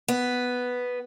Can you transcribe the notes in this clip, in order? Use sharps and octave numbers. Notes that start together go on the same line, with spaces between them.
B3